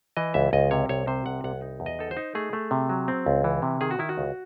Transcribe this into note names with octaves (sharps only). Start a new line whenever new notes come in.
E3 D#5
C#2 E5
C#2 D#5
C3 C#5
C2 C#5
C3 C5
C2 F#5
C2 F#5
D#4
E2
D#5
D#4 A4
C5
D#4
A3 G#4
A3
C3
F#3
C4
C#2
E3
C3
D#3 G#4
F#4
D#3 E4
F#4
C#2